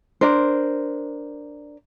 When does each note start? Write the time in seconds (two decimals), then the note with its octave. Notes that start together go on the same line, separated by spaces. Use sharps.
0.21 D4 A#4 C5